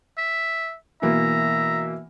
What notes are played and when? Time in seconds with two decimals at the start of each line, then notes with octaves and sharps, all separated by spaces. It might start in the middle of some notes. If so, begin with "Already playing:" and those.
0.18 E5
1.02 B2 E3 A#3 E5 A#5